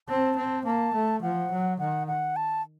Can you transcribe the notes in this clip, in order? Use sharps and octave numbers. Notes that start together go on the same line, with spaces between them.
C4 A5
C4
A#3 A5
A3
F3 F#5
F#3
D#3 F#5
F#5
A5